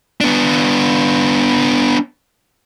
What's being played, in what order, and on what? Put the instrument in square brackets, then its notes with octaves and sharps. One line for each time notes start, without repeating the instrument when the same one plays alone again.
[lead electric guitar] B3 D4